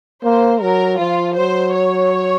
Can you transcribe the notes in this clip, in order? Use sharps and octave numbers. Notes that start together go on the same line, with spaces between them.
A#3 C5
F#3 A#4
F3 F4
F#3 C5
C#5